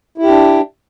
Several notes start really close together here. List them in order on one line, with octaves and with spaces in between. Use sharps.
E4 G4 D4